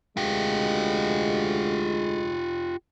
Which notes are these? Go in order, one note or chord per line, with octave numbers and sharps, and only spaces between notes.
D2 G#3 F4 G4